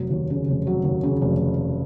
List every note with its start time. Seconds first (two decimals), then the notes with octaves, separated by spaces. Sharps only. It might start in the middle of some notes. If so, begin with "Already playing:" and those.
Already playing: F1 F#3
0.11 D#2
0.30 C#3
0.48 F1
0.67 F#3
0.84 D#2
1.03 C#3
1.22 F1